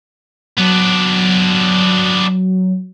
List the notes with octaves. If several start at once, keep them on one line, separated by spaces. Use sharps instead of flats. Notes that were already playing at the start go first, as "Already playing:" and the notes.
F#3 B3 D4